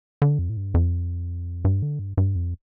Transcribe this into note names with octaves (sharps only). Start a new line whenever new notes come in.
D3
F2
A2
G2
F2
G2
D3
G2
G2
F2